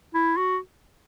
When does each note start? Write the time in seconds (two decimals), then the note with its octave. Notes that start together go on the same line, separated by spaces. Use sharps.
0.14 E4
0.37 F#4